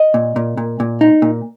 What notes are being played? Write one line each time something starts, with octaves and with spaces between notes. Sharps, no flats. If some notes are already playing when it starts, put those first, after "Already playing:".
Already playing: D#5
A#2
A#2
A#2
A#2
D#4
A#2